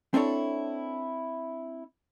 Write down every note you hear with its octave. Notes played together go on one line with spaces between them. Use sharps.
C4 D4 E4 A4 C#5